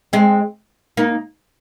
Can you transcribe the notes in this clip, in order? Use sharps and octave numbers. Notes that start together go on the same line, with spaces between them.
G#3 C4
A#3 D#4